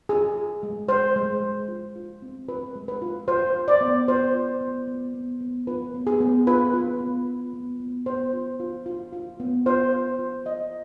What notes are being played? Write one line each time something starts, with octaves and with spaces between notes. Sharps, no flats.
F4 G#4
F4
G#3
G#3 C5
G#3
G#3
F4
F4
C4
F4 B4
G#3
B4
F4
F4 C5
F4
D5
B3
F4 C5
F4
B3
B3
B3
B3
F4 B4
B3
G#4
B3
F4 B4
F4
B3
F4
B3
B3
B3 C5
F4
F4
F4
F4
B3
F4 C5
F4
F4
F4 D#5